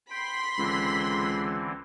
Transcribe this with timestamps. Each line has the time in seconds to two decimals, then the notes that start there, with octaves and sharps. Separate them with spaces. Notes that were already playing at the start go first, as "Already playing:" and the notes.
0.11 G5 B5 C6 B6
0.58 C#2 D3 E3 C4